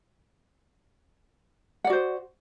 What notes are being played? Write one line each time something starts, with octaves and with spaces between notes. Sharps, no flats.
F#4 C5 D5 F#5